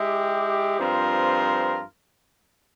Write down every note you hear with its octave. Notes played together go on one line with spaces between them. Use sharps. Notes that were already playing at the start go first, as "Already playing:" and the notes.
Already playing: G#3 E4 G4
G2 F3 C4 F4 A#4